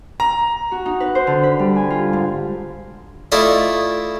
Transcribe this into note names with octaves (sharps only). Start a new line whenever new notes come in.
A#5
F#4
D#4
B4
C5
D3
B5
G3
G#5
F4
G#2
A3 E4 F4 D5 D#5